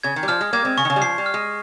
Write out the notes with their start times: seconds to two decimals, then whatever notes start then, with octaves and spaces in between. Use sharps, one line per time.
0.03 C#3 G#6
0.16 D#3
0.23 G3
0.28 F3 F6
0.41 G#3
0.53 G3 A#3 G#6
0.65 G#3 C4
0.77 C#3 C#6
0.85 D#3
0.90 C#3
0.96 G3
1.02 F3 C7
1.18 G3
1.26 F6
1.34 G#3